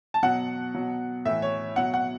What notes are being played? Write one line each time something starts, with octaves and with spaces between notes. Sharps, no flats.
A5
B2 F#3 F#5
B2 F#3
A2 E3 E5
C#5
B2 F#3 F#5
F#5